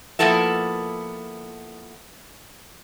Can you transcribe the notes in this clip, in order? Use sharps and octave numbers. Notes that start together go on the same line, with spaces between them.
F3 A#3 B3 E4 A4 E5